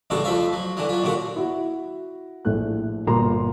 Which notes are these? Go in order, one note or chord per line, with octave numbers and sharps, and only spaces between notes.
A1 G2 C#3 F#4 A4
F2 F3 E5 F5
F#3
D3 E3 F#3
F#3 F4
D#2 A#2 D3 F#4
E4 F#4
A#1 A2 A3 F#6
G1 A#2 A#5 C6